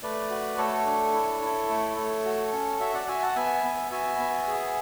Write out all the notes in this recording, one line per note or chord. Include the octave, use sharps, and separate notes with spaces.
A3 B4 D5
F#4
A3 A4 C#5
D4
E4
E4
A3
A3
F#4
C#4
F#4 C#5 E5
D5 F#5
F#4 E5 G#5
F#5 A5
B3 E5 G#5
B3
F#4 E5 G#5
B3
G#4